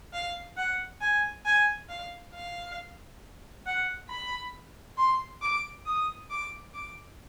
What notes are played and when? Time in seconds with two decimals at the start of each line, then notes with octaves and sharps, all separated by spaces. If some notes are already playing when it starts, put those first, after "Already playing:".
0.13 F5
0.57 F#5
1.01 G#5
1.45 G#5
1.89 F5
2.34 F5
3.66 F#5
4.09 B5
4.98 C6
5.42 D6
5.86 D#6
6.30 D6
6.74 D6